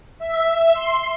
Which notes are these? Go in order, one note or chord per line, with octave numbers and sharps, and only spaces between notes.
E5
C6